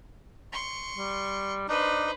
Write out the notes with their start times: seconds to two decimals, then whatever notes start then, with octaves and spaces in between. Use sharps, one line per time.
0.52 C6 C#6
0.96 G3
1.69 D4 D#4 B4 C5